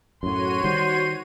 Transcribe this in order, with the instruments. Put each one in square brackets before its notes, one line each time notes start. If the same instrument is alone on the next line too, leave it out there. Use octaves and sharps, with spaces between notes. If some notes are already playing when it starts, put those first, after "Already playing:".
[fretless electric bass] F#2 A2 [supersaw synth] F#4 C#5 D#7 [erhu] C6
[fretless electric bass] D#3 G3 [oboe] C5